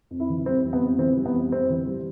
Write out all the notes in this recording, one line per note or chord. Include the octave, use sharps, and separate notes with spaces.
F2
E4
E3
G3 C4
F2
B3
F2
E3 C4
G3
B3
F2
F2 C4
E3
G3